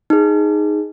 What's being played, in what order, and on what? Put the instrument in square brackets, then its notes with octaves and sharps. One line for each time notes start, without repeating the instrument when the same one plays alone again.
[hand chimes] D#4 G#4